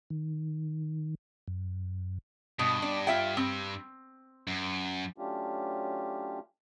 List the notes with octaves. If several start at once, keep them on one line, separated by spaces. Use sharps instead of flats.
D#3
F#2
G2 B2
D4
F4 E5 G5
C4
F#2
F#3 A3 C#4 D4 F4 G4